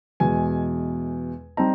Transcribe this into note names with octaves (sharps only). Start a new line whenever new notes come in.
E2 B2 G#3 G#5
G3 C4 D#4 A#5